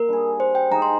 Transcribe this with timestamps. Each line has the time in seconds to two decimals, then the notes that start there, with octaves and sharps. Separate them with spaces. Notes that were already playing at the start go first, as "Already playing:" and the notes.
Already playing: A#3 A#4
0.08 G3 D4 G#4
0.40 C5
0.55 G5
0.71 G#3 D#4 G#4 C5 A#5
0.82 C6